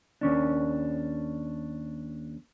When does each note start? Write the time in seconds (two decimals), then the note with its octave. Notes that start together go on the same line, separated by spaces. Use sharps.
0.21 D#2 C#4 D4